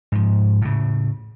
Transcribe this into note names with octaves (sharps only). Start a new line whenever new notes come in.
G#2 F3
A2 C#3